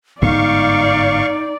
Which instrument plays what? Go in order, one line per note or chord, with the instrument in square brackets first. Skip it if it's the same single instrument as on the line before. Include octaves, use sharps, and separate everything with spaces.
[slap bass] G1 G#2 B3 [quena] D#4 [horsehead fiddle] D5 [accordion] F5 C#6